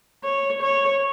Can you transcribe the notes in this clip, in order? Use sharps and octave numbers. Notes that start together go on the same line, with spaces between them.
C#5
C#5